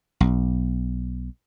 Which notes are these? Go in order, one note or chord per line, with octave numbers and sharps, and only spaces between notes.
B1